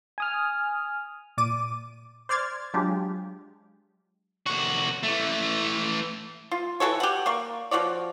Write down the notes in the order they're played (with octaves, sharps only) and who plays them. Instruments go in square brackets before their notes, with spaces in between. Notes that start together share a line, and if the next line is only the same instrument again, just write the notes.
[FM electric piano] G#5 D#6 F6
[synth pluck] A#2 D5 D6 D#7
C5 D5 F6 G#6 A6
F#3 G#3 D4 F4 G4
[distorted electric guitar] C2 F#4
E3 A3
[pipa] F4
E3 F#4 A4 C#5
G4 F#5
A#3 D5 C#6
F3 F#4 C#5 D5